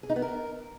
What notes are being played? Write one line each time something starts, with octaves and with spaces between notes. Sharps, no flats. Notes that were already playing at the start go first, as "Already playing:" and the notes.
G#4
D#4
B3
A#4